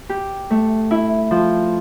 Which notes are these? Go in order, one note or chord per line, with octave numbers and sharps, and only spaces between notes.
G4
A3
E4
F3